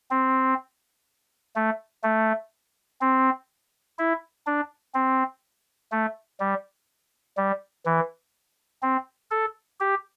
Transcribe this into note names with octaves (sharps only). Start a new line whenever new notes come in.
C4
A3
A3
C4
E4
D4
C4
A3
G3
G3
E3
C4
A4
G4